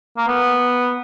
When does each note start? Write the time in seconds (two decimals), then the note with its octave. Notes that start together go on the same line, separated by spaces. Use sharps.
0.18 A#3
0.27 B3